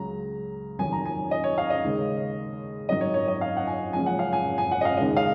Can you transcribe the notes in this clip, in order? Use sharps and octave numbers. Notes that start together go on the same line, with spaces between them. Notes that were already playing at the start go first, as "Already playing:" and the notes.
Already playing: C#2 C#3 F#3 A#5
F1 D#2 D#3 F#3 G#5
A#5
G#5
D#5
C#5
F5
D#5
D#2 C#3 G#3
G#1 F#2 D#3 F#3 D#5
C#5
C#5
D#5
F5
F#5
G#5
F#1 F#2 F3 G#3 G#5
F#5
F5
G#5
G#5
F#5
D#5
F5
D#2 C#3 G#3 D#5
F5